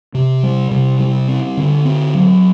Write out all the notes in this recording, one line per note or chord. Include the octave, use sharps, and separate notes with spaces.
C3
G3
C3
G3
C4
D3
C4
F#3